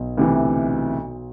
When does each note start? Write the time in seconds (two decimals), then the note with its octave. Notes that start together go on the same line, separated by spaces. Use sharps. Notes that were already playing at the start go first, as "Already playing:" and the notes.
Already playing: B1 B2
0.18 D2 C3 E3